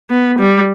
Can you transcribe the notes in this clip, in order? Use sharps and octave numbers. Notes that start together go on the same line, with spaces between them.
B3
G3